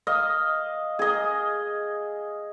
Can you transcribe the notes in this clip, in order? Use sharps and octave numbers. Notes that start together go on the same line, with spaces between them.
D#5 F5
G#4 D#5